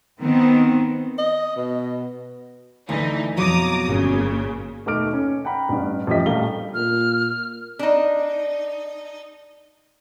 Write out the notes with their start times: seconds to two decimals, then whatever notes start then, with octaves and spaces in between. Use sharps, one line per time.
0.21 D#3 B3 C4
1.18 D#5
1.56 B2
2.89 D2 E3 D#4
3.37 F2 B2 F#3 A#5 D6 D#6
3.89 G1 A#2 C#3
4.86 D#2 B2 A3 D6 F6 D7
5.13 C#4
5.45 F#5 G5 A#5 B5
5.69 A1 G2
6.07 A1 F3 G4 D#5 E5 B6
6.26 A#1 G3 A3 A#4 F5 G7
6.74 A#2 F6
7.79 D4 D#4